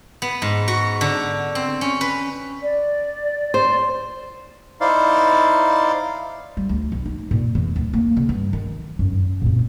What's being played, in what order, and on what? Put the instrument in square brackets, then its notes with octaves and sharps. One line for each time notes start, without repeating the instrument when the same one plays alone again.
[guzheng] B3
G#2
F#4
D3
C4
C#4
B4
[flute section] D5
[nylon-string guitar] C5
[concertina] D#4 E4 C5 D5 F5
[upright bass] G3
D2
B1
D#4
A#2
E2
D1
A#3
C#3
G2
D#3
F#2
A#2 C4